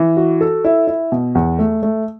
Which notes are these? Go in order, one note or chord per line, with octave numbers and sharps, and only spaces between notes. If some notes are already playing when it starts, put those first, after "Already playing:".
Already playing: E3
F#4
A4
E4
E4
B2
E2
A3
A3